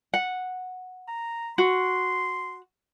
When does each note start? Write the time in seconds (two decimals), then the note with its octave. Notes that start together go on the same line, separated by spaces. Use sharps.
0.14 F#5
1.08 A#5
1.58 F#4 C6